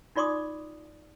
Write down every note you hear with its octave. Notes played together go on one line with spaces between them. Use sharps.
D#4 F4 D5 C6 D6 D#6